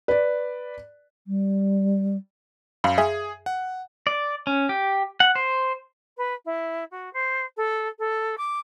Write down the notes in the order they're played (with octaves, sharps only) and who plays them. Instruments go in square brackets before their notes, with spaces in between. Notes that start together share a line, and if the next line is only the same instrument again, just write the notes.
[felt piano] B4 D5
[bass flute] G3
[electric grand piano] F#2 [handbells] F5 B5
[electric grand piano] G#4 [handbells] E5 G#5
[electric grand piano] F#5
[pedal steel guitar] D5
C#4
G4
F#5
C5
[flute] B4
E4
F#4
C5
A4
A4
D6